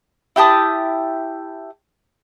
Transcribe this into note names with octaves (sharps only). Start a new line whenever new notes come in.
E4 G4 A5 D#6